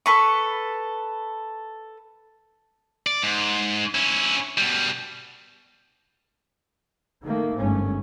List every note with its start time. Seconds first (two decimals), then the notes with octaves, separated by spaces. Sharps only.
0.06 A4 B4 C#6
3.07 D5
3.22 G#2
3.95 C#4 E4
4.58 B2 G3
7.23 D#3 A3 A#3
7.57 G1 G#2 A3 C#4